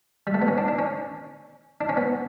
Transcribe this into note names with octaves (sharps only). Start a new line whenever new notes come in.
G3
A3
B3
C#4
D4
D4
C#4
D4
C#4
B3